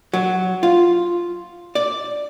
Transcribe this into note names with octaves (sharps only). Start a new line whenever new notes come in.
F#3
F4
D5